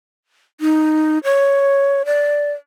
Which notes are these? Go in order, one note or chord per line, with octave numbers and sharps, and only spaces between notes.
D#4
C#5
D5